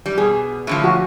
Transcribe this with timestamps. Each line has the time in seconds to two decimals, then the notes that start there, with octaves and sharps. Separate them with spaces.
0.06 G3
0.18 B2 G#4
0.67 A2 D3 F3
0.84 F#4